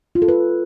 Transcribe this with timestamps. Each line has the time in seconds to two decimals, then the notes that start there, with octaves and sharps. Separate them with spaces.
0.15 F4
0.22 A4
0.28 B4